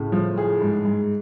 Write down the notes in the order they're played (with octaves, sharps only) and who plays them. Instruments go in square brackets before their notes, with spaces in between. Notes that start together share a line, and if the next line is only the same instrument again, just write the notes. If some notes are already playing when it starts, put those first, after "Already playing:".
Already playing: [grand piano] A2 C#3
[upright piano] F3
G#4
G#2
G#2